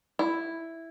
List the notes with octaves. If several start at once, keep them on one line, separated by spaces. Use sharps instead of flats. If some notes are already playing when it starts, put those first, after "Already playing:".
E4